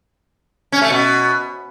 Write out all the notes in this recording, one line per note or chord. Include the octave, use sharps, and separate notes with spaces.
C#4
A3
B2